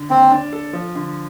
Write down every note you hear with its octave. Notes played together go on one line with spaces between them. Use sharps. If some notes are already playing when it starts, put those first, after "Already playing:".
Already playing: D3
D#2 C4
D4
A4
F3
D3